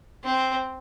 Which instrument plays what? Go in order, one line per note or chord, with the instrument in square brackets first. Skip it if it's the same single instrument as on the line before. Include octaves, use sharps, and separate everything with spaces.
[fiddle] C4